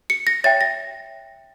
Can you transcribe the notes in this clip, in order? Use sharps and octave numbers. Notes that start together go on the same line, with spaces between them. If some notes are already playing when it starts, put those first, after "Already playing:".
C#7
A#6
C#5 E5 G5 A6
A#6